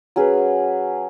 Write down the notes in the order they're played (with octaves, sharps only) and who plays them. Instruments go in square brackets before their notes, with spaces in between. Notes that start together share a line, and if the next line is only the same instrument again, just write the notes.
[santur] F#3 C#4 G#4 B4